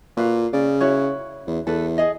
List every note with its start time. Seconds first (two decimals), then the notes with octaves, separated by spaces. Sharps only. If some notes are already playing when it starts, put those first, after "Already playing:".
0.17 A#2 F#4 B4 F5
0.53 C#3 D5
0.81 E4 F#4 C#5
1.47 E2
1.67 E2 A4 B4
1.98 G#4 D#5